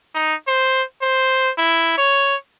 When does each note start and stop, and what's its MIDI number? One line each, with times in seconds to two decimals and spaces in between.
0.15 0.35 63
0.47 0.83 72
1.02 1.50 72
1.58 1.93 64
1.97 2.35 73